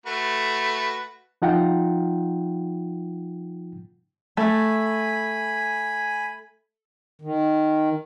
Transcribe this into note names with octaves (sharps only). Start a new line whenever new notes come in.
A3 F#4 B4
F3 D#4 F4 F#5 G5
A3 G#5 B5
D#3